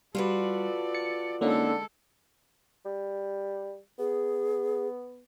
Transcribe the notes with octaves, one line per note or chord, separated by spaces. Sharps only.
G3 F4 F#4 A4 B4 D5
A6 C#7
D3 G#3 A#3 C#4 D#4 A4
G3
B3 G#4